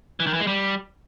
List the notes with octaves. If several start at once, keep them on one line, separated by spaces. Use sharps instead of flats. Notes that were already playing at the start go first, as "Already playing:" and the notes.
E3
D#3
E3
G#3
G3